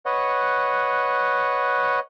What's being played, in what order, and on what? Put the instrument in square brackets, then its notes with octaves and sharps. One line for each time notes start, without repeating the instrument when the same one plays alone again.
[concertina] B4 C#5 D#5 F#5